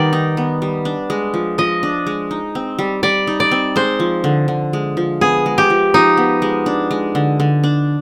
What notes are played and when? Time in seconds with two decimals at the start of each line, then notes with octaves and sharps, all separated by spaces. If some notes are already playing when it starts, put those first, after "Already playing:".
Already playing: D#3 G3 B3 D5
0.13 D#4
0.37 B3
0.62 G3
0.85 D4
1.10 G#3
1.34 F3
1.58 F3 D#5
1.83 D4
2.07 G#3
2.31 D#4
2.55 C4
2.79 G3
3.03 G3 D5
3.27 D#4
3.40 D5
3.51 C4
3.76 G#3 C5
4.00 F3
4.24 D3
4.48 D3
4.73 G#3
4.97 F3
5.21 B3 G#4
5.46 G#3
5.58 G4
5.70 F3
5.94 F3 D#4
6.17 B3
6.42 G#3
6.66 D4
6.91 G#3
7.15 D3
7.40 D3
7.64 D4